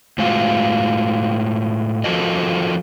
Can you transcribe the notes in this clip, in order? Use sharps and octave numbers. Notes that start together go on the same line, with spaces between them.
A2 G#3 F4 F#4
F3 F4 F#4 A4 A#4 D#5